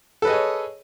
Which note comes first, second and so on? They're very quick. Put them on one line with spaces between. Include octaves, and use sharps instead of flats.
A4 B4 D#5 G#4 C#5